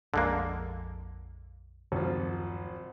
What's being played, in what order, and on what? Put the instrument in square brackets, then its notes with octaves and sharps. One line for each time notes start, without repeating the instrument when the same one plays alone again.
[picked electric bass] A#1 F2 F3 [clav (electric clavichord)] D3 G#3 A#3
[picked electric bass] D1 F#2 C#3 [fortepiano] G#1 F3